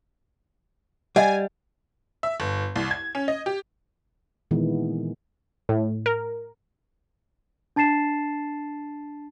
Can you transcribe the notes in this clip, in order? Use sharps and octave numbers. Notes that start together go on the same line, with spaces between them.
G3 D#5 F#5 G#5
E5
G1
C2
G#6
C#4
D#5
G4
A#2 D#3 E3 G#3 B3
A2
A#4
D4 A5 A6 C7 E7